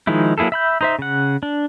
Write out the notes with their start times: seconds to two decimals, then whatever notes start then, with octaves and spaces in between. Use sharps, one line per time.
0.07 D#3 F3 G#3 D#4 E4
0.38 F#3 A#3 E4 G#4 A4
0.52 E5 B5 G6
0.81 D#4 C5 E5
0.99 C#3 F#5
1.43 D4